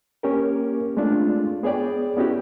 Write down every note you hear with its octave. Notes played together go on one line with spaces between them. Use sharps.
A#3 C#4 G4 A#4
G#3 A3 C4 D4 F4
B3 G#4 C#5 D5 G5
B3 C#4 E4 F#4 G4